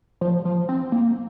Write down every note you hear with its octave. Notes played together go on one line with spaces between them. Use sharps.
F3
F3
C4
A#3